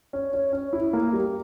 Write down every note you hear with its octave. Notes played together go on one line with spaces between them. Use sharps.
C#4
C#4
C#4
E4
A#3
G3